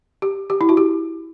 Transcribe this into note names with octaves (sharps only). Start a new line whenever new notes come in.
G4
G4
E4
F#4
G4